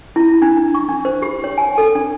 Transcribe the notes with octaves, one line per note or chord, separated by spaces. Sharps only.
E4
D4
D4
C#6
D4
C5
G4
C#5
G#5
A4
D4